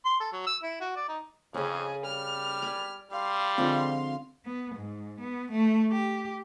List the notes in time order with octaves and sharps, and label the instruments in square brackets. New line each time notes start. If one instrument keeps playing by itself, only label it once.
[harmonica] C6
A4
F#3
E6
E4
F#4
D5
D#4
[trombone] F2 [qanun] C#3 C#4 [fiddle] G#4
[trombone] G3 [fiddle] F6
[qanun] D5 G#5 B5
[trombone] G3 [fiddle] F5 C6
[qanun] D3 F3 G#3 [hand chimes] C4
[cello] B3
G#2
B3
A3
G4